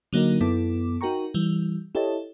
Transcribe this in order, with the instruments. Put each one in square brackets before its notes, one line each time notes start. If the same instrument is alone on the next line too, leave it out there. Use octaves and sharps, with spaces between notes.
[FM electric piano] D3 F#3 A#3 D#4 F#4 A#4
F#2 B3 E4 A4 D6
D#4 F#4 A#4 G5 A#5 C#6
E3 G3
E4 G4 A4 C#5 D#5 A5